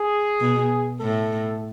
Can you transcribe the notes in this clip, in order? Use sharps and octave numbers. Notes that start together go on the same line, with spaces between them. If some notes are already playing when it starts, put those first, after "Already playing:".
Already playing: G#4
B2
A2 A4